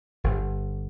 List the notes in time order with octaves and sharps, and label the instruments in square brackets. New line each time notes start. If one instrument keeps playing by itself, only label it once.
[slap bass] G1